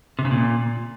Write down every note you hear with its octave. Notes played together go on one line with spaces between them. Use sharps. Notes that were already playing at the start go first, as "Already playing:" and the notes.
C3
C#3
A#2